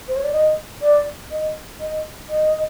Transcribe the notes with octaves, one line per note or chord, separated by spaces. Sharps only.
C5
C#5
D5
D#5
D5
D#5
D#5
D#5